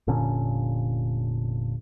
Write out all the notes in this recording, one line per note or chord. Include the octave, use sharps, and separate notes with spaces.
F1 A#2 D3 C#4